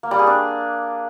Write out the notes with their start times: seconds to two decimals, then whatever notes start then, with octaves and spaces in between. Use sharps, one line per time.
0.03 A#3
0.11 G3
0.19 G#4
0.27 D4